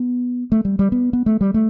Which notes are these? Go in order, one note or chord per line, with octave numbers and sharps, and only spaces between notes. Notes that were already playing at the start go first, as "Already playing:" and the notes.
Already playing: B3
A3
G3
G3
B3
B3
A3
G3
A3